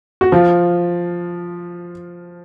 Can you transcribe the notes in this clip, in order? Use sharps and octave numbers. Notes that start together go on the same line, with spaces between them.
F#4
F3 F4